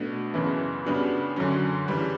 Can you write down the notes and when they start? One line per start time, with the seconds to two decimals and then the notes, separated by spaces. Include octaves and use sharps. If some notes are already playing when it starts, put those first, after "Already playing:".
Already playing: B2 A3 D4
0.34 F#2 C#3 E3 B3 E4
0.85 C#3 G3 B3 D4 F#4
1.36 F#2 D3 F#3 C#4
1.88 C#3 E3 G3